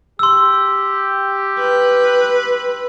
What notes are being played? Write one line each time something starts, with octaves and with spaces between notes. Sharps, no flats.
G4 C6 E6
B4